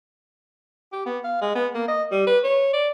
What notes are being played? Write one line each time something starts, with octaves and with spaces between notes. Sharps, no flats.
G4
B3
F5
G#3
B3
A#3
D#5
G3
B4
C#5
D5